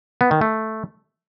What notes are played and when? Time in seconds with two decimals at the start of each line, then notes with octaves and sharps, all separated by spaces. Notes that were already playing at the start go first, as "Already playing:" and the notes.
0.21 B3
0.31 D#3
0.41 A3